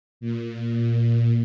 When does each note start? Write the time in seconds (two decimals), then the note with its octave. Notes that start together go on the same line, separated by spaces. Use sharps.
0.21 A#2